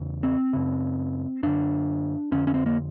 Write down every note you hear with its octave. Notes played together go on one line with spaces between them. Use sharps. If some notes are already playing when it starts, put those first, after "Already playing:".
Already playing: E2 C#3
C4
F#2 C#3
F#2 D3 D4
F2 D3 C#4
C#4
C4
A#3